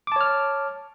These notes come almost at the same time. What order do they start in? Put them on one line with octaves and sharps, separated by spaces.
D6 A5 C#5 F6